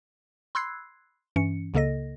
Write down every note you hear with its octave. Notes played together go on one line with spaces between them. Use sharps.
B5 C6 E6 F#6 G#6 C7
G2 E3 C#4 C#7
C#2 C#3 A#3 A4 D#5 A#6